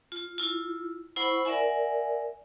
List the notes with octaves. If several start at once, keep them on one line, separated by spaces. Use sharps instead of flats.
F4
E4 F4
E4 C5 F#5 B5 C#6
A#4 D5 E5 F#5 G#5